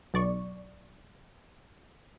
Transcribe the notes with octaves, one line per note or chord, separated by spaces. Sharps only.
B1 D5 C#6